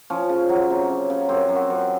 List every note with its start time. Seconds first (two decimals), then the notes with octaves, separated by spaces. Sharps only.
0.10 F3 C#4
0.29 C#3
0.49 F#3
0.70 C3
0.89 C#3
1.10 C#3
1.29 F#2 C4
1.49 F#2
1.56 F#4
1.70 F#2